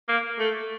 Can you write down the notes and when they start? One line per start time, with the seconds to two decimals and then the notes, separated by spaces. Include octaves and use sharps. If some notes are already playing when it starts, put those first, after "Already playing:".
0.08 A#3
0.39 A3